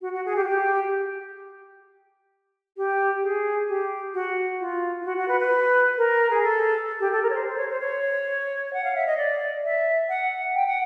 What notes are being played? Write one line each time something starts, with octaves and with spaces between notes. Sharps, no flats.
F#4
F#4
G#4
G4
F#4
G4
G4
G#4
G4
F#4
F4
F4
F#4
F#4
B4
B4
A#4
G#4
A4
G4
A4
A#4
C#5
C5
C5
C#5
C5
C#5
F#5
F5
E5
D#5
D5
E5
F#5
G5
F#5